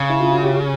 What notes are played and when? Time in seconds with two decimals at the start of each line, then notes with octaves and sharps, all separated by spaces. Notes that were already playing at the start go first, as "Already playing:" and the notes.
Already playing: C#3
0.09 E4
0.20 F4
0.31 F#4
0.43 G4
0.54 G#4